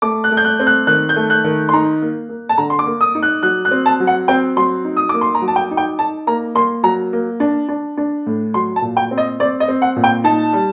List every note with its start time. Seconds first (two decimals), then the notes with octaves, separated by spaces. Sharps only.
0.02 A3 D6
0.24 F#6
0.31 A3
0.37 G6
0.45 F#6
0.60 C4
0.67 F#6
0.87 D#3 F#6
1.09 G6
1.16 A3
1.30 F#6
1.44 D#3
1.69 C6
1.73 D#4 A#5
2.02 A#3
2.29 A#3
2.49 A5
2.58 D3 A#5
2.70 C6
2.79 D6
2.86 A#3
3.01 D#6
3.15 D#4
3.23 F#6
3.43 F#3 F#6
3.65 F#6
3.71 C4
3.86 A5
4.00 F#3
4.07 F#5
4.28 C4 G5
4.56 F#3 C6
4.85 D#4
4.97 D#6
5.09 A#3 D6
5.21 C6
5.35 A#5
5.42 F#3
5.48 A5
5.56 G5
5.71 D#4
5.77 G5
5.99 D#4 A5
6.27 A#3 A#5
6.55 A#3 C6
6.83 F#3 A#5
7.13 A#3
7.40 D4
7.68 D4
7.97 D4
8.26 A2
8.54 F#3 C6
8.76 A5
8.82 A#2
8.97 G5
9.11 C4
9.18 D#5
9.40 C4 D5
9.60 D#5
9.68 C4
9.82 F#5
9.96 A#2
10.04 G5
10.24 D#4 A5
10.53 G3